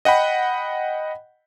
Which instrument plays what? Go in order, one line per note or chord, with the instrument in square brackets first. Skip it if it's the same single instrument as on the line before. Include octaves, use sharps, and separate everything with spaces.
[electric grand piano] D#5 F#5 G5 B5